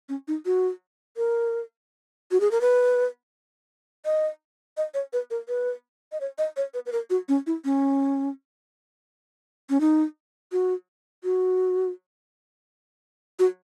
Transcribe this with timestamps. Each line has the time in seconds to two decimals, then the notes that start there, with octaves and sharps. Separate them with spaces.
0.09 C#4
0.28 D#4
0.46 F#4
1.17 A#4
2.32 F#4
2.40 G#4
2.51 A#4
2.61 B4
4.05 D#5
4.77 D#5
4.94 C#5
5.13 B4
5.31 A#4
5.48 B4
6.12 D#5
6.21 C#5
6.38 D#5
6.57 C#5
6.74 B4
6.86 B4
6.92 A#4
7.10 F#4
7.29 C#4
7.47 E4
7.65 C#4
9.70 C#4
9.81 D#4
10.52 F#4
11.24 F#4
13.39 F#4